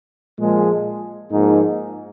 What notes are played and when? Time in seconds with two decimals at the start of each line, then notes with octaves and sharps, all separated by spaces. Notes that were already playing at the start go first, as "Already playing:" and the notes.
0.38 A#2 F3 G#3
1.30 G#2 F3 A#3 D#4